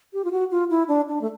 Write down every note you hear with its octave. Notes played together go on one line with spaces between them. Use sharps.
G4
F4
F#4
F4
E4
D4
D4
A3